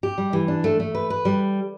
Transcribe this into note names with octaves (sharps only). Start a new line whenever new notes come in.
G4
G3
E3
D4
A3
A3
B4
B4
G3